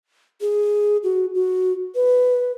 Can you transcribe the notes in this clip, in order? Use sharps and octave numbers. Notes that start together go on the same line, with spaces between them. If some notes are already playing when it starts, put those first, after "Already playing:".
G#4
F#4
F#4
B4